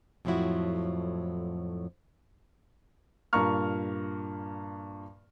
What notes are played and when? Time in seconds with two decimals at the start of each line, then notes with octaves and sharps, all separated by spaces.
0.25 F2 A2 F3 F#3 E4 F#4
3.33 G2 A#2 A#3 A#5 C#6 F6